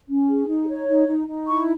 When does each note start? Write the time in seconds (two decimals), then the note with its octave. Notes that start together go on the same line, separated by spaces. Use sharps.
0.08 C#4
0.29 G#4
0.48 D#4
0.68 C#5
0.87 D#4
1.08 D#4
1.28 D#4
1.47 E4 C#6